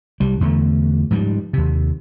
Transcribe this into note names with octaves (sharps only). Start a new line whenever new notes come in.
C2 G3
E2 D3 A3
G#2 F3 G3
D#2 C3